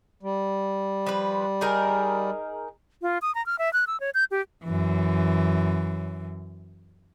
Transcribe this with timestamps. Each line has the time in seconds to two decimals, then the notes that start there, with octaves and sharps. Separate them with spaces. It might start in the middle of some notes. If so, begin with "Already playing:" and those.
0.23 G3
1.06 F3 B4
1.61 D#4 G#4 A#4
3.02 F4
3.22 D#6
3.35 A#5
3.46 F6
3.59 E5
3.73 F#6
3.87 E6
4.00 C#5
4.14 G6
4.31 G4
4.65 F#2 E3